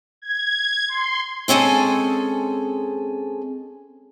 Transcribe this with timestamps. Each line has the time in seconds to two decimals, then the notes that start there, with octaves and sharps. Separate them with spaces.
0.22 G#6
0.89 C6
1.48 G#3 C4 C#4 G#4 A4